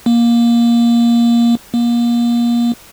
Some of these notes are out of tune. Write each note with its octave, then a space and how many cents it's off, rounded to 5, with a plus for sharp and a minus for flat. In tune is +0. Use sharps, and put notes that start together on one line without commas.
A#3 +15
A#3 +30